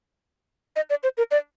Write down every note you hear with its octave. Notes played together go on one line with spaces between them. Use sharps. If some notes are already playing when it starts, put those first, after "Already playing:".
D#5
D5
C5
A#4
D5